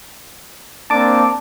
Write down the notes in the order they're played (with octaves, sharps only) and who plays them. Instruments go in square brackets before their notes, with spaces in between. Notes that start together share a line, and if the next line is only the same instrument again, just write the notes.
[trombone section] A#3 C4 D4 [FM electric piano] A5 D6